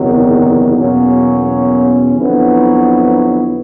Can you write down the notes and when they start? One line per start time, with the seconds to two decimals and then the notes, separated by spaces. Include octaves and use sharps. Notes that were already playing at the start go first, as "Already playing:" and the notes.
Already playing: F#1 E2 C3 D#3 F#3
0.75 E2 B2 F#3 A#3 C#4
2.15 F2 D3 F#3 B3 E4